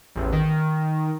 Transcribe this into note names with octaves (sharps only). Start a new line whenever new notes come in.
A1 E2
D#3